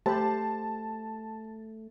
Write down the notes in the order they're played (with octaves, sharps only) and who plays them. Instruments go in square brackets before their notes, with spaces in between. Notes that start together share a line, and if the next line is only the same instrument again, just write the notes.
[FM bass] A3 [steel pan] G4 C5 B5 [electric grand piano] A5